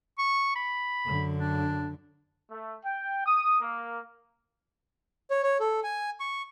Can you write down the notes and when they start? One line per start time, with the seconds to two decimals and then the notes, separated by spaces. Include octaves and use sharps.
0.18 C#6
0.55 B5
1.05 F#2 D3
1.37 D4
2.50 A3
2.85 G5
3.26 D#6
3.61 A#3
5.30 C#5
5.43 C#5
5.60 A4
5.84 G#5
6.20 C#6